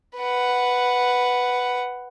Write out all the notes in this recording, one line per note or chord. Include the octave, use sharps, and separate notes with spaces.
B4 F#5